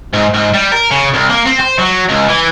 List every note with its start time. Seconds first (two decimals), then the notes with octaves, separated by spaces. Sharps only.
0.13 G#2
0.34 G#2
0.54 G3
0.72 A#4
0.91 C#3
1.14 C2
1.30 A#3
1.46 C4
1.60 C5
1.79 F#3
2.09 C#2
2.29 E3